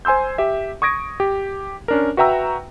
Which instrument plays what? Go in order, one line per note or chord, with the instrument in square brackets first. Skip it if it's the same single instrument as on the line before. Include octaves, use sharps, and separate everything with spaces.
[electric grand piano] C5 G#5 C6 E6 G6
G4 E5
C#6 D#6 G#6 A#6 D7
G4
C#4 D4 A#4
F#4 B4 E5 G5 A#5 E6